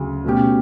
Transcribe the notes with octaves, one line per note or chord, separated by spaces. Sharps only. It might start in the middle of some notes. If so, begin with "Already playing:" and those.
Already playing: D2 C#3 F#3
B2 A3 C#4 G4